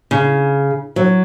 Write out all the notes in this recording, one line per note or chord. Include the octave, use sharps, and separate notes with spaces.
C#3
F#3